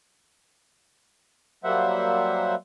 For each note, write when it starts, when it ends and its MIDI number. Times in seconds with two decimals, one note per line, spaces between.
1.64 2.55 54
1.64 2.55 55
1.64 2.55 58
1.64 2.55 72
1.64 2.55 76
1.64 2.55 78